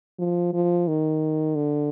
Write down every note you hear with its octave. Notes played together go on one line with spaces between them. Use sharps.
F3
F3
D#3
D3